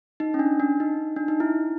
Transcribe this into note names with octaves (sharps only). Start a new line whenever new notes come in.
D#4
C#4
D4
D4
D#4
D4
D#4
E4